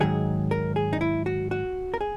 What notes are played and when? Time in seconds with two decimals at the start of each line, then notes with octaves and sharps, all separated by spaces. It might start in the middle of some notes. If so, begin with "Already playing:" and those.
0.01 G#2 D#3 F#3 G#4
0.51 A#4
0.76 G#4
0.93 D#4
1.01 E4
1.26 F#4
1.51 F#4
1.94 A#4
2.01 G#4